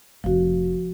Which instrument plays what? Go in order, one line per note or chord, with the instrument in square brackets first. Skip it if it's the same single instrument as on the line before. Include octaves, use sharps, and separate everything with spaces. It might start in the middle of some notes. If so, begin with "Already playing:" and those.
[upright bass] F1 [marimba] F3 F#4